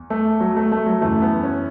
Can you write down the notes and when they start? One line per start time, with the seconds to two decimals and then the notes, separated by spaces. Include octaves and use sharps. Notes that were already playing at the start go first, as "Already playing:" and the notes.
Already playing: E2
0.10 A3
0.40 F#3
0.56 A3
0.72 A3
0.86 F#3
1.01 F#2 C#3 E3 A3
1.22 B3
1.43 C#4